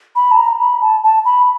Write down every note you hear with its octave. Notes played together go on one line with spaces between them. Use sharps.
B5
A5
A#5
B5
A5
A5
B5